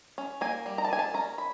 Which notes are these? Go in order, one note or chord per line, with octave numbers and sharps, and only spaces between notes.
C#4
A#3 G#5
G3
A#5
A5
A#3 G#5
A5
C#4 A#5
B5